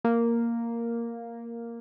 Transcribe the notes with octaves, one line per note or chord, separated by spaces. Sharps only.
A#3